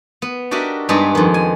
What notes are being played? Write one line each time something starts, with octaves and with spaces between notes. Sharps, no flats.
B3
D4 F#4 G4 A#4 D#5 E5
G2 G#3 B3 D4 D#4 G4
F2 D#3
G#5